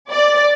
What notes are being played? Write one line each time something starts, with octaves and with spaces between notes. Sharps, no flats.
D5